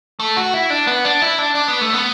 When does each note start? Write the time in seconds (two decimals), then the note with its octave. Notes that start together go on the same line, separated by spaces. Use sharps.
0.20 A3
0.37 F#4
0.54 E4
0.70 D4
0.87 B3
1.05 D4
1.22 E4
1.38 D4
1.55 D4
1.68 B3
1.81 A3
1.93 B3